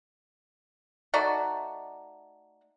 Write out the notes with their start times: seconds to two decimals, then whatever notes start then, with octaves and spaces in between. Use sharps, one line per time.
1.14 A3 D#4 F#4 D5